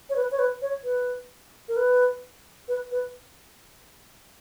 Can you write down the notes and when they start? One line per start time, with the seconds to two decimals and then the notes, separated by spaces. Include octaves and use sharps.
0.10 C#5
0.16 B4
0.31 C#5
0.39 B4
0.62 C#5
0.84 B4
1.68 A#4
1.77 B4
2.68 B4
2.91 B4